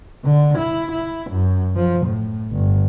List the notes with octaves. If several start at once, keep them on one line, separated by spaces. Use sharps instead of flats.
D3
E4
E4
F#2
F3
A2
G1